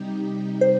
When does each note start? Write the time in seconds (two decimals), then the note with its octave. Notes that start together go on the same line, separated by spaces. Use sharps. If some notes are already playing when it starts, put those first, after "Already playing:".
Already playing: C3 G3 D#4 G4
0.61 C5